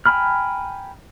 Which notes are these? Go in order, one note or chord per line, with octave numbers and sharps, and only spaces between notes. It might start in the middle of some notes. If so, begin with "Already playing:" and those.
G5 G#5 A#5 B5 F6